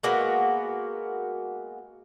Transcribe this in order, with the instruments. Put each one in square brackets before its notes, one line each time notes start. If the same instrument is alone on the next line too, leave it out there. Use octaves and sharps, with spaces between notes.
[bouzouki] G#3 A#3 B3 F#4